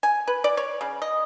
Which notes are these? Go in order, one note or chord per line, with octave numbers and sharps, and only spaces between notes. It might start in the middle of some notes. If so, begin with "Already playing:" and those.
G#5
B4
D5
C#5
C#3
D#5